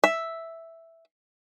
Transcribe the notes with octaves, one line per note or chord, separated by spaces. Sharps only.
E5